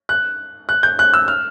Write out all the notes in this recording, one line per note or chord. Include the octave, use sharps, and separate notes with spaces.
F#6
F#6
G6
F#6
E6
F6